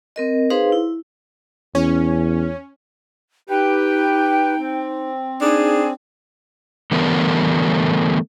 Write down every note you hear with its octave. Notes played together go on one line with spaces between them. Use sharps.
C4 A#4 D#5
D#4 G#4 B4 C5 F5 C6
E4
E2 C#4
D#4 G4 B4 G5
C4
D4 D#4 G#4
D3 E3 G3 A3 B3 A#4